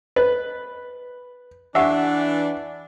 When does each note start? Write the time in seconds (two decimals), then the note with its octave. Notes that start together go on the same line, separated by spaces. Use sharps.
0.16 B4 D#5
1.75 E3 D4 G4 E5 F#5 G#5